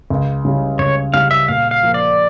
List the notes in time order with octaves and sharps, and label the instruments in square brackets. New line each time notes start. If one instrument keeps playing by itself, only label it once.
[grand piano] C#2
C#3 G3 C#4 E4
[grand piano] C#2 [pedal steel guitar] C#5
[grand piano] C#3 G3 C#4 E4 [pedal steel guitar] F5
[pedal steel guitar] E5
[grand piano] A#2 [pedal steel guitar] F5
[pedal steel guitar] F5
[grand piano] F3 A#3
[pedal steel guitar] D5